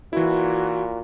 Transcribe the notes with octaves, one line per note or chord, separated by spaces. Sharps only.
A#2 E3 E4 F#4